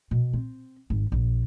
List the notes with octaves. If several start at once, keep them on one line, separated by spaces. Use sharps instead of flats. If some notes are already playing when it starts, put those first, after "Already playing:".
B2
C4
G#1
A#1